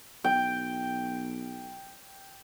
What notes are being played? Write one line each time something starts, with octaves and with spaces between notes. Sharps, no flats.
B1 G5